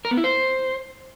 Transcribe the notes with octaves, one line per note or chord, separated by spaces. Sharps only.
A#4
B3
E4
C5